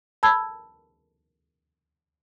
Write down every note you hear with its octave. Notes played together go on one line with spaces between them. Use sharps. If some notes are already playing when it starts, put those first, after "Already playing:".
A5 B5 E6 G#6